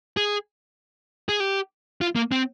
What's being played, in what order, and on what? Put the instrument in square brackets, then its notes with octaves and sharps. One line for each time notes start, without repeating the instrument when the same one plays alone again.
[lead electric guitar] G#4
G#4
G4
F4
A#3
C4